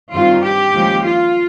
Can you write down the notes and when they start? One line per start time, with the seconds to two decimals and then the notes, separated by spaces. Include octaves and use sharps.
0.12 G2 D#3 G3 C4 F4
0.42 G4
0.74 D#2 C#3 F3 G#3
1.05 F4